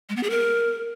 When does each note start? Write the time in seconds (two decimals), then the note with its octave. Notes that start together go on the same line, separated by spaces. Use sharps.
0.09 G#3
0.16 B3
0.23 G#4
0.30 A#4